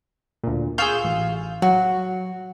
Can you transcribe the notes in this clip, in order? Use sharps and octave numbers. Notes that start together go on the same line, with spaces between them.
D2 A#2
F4 G#4 F5 C#6 E6 G6
A1
F#3 F#4